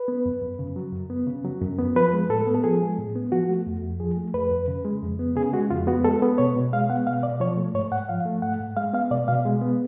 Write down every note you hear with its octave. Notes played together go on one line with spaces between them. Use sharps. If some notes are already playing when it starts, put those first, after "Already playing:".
Already playing: B4
B3
F#2
F#2
C#3
F#3
F#2
B3
C#3
F#3
F#2
B3
F3 B4
G#3
A2 A4
B3
A4
F3 G#4
G#3
A2
B3
F3 F#4
A3
F2
F2
F3 G#4
A3
F2 B4
F2
C#3
G#3
F2
B3
C#3 G#4
G#3 F#4
F2 F4
B3 F#4
G#3 A4
B3
B2 C#5
B2
G#3 F5
B3 F#5
B2 F5
B2 D5
F3 C#5
A3
G#2 C#5
G#2 F#5
F3 F5
A3
G#2 F#5
G#2
G#3 F5
B3 F5
B2 D5
B2 F5
G#3
B3